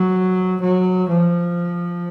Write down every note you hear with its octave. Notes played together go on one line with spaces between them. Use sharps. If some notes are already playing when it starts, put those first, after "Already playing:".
Already playing: F#3
F#3
F3